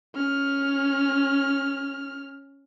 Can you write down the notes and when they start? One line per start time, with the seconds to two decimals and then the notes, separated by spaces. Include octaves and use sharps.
0.16 C#4 F6